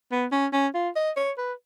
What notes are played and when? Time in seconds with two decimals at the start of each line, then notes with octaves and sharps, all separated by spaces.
0.12 B3
0.32 C#4
0.53 C#4
0.74 F4
0.96 D#5
1.17 C#5
1.38 B4